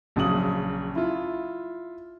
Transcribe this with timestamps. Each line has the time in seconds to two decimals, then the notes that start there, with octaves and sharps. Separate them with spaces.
0.16 A#1 C#3 F#3 D#6 F#7
0.96 E4 F4